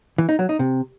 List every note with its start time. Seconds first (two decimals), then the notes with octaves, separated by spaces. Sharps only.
0.18 E3
0.29 D#4
0.39 F#3
0.49 D#4
0.59 C3